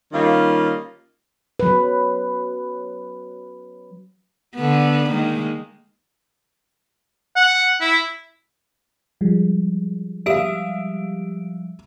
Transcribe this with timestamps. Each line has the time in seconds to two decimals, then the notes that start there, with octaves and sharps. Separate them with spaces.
0.13 D#3 G3 A#3 C#4 D#4 F4
1.60 F#3 B4
4.55 D3 B3
5.09 D#3 G#3 A#3
7.36 F#5
7.81 E4
9.21 F3 G3 G#3
10.26 G4 E5 F5 D7